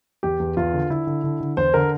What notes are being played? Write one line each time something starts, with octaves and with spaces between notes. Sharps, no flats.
E2 G4
E2
E2 F4
D3
D3 E4
D3
D3
D3
E2 C5
D3 A#4